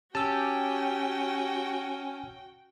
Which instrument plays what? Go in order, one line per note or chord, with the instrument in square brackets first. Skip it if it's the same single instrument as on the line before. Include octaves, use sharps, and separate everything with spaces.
[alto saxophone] C#4 [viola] F#4 G5 [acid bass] G4 [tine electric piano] A5 E6